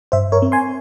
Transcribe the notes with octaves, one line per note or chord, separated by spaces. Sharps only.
G2 C5 E5
A#4 C#5
C4
G#5 C6